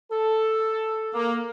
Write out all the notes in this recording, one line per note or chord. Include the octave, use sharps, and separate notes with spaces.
A4
A#3